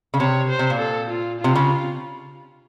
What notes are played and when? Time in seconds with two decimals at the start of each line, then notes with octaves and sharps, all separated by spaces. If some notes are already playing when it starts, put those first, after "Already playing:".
0.14 C#3
0.20 C3 C#5
0.50 C5
0.59 C3
0.70 A#2
0.79 A4
1.10 F4
1.41 C3 F4
1.55 C#3